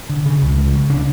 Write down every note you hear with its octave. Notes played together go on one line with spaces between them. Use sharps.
D3
C#3
C#2
C#2
C#3
C#3 D4